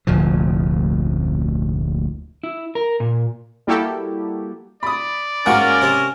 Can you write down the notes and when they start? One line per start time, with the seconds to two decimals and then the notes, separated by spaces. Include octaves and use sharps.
0.07 F1 D2 A#2 F3
2.43 E4
2.75 A#4
3.00 A#2
3.67 G3 A#3 E4 F#4 G4 A4
4.83 D5 B5 D#6
5.46 G#2 A#3 C#4 F#4 A#4 F#5
5.82 C3 C4